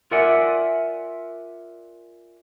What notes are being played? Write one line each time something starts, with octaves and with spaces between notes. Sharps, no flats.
F4 A#4 D5 E5 F#5 G#5